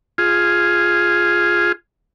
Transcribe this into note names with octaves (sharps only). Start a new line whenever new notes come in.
F4 G#4